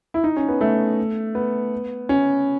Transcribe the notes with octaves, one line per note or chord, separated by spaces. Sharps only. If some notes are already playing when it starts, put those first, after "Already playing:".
E4
D#4
C#4
B3
A3
B3
C#4